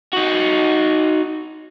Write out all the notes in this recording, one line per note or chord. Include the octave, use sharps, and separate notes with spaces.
D#4 F#4